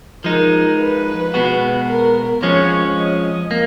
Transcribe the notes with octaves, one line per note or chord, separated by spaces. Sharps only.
F3 G#3 D#4 A#4
B4
B2 G#3 B3 F#4
A#4
F2 F3 G#3 C#4 C#5
D#5
A#3